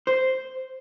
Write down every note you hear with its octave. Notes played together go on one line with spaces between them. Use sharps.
C5